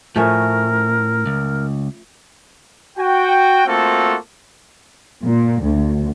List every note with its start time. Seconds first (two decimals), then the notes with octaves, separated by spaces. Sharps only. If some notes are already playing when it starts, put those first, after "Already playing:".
0.16 A2 F3 A3 C#4 A#4
1.26 C#2
2.98 F#4 G5
3.67 A3 A#3 C4 F4 F#4 A4
5.25 A#2
5.62 D2